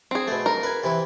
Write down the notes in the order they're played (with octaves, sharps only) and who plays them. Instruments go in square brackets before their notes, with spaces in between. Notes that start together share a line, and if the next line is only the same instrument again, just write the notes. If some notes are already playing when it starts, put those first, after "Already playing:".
[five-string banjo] C4 G#4
[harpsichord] B2 A3
[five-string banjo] A#4
[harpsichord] B4 G#5
C3 E3 E4